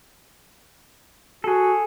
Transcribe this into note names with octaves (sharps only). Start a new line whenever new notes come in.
F#4 G#4 A4